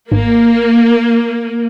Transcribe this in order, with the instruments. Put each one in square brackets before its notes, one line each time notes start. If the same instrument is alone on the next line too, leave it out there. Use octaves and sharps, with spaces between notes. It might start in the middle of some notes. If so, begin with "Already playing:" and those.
[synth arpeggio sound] G#1 [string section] A#3